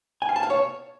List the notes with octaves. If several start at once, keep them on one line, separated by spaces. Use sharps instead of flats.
G#5
F5
A5
F5
C#5